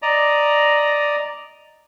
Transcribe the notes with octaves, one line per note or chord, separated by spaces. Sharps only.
D5 D#5 A#5